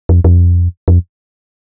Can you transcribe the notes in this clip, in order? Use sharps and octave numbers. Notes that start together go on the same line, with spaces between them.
F2
F2
F2